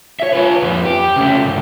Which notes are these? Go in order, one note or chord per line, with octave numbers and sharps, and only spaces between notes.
C#5 E5
F4 B4
F2 B4
G4
C#3 A3
C#2 G2